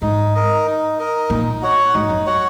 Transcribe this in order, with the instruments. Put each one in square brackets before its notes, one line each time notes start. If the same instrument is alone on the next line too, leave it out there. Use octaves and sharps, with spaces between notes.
[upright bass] G#2 [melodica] D#4
[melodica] A#4 D#5
D#4
A#4 D#5
[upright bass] A#2 [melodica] D#4
[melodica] F#4 C#5 F#5
[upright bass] G#2 [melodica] D#4
[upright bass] F#2
[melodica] F#4 C#5 F#5